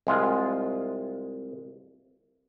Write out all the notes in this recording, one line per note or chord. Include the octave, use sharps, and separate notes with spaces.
C2 G#3 F4